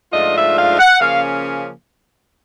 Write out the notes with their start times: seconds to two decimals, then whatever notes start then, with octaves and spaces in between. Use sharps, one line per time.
0.12 G#2 F3 A3 D4 F4 D#5
0.34 E5
0.57 F5
0.79 F#5
1.01 C#3 F3 A#3 C#4 F5